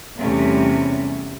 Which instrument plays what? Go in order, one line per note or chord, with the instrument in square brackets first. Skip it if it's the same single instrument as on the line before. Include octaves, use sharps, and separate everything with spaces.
[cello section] E2 C3 G3 A3 C#4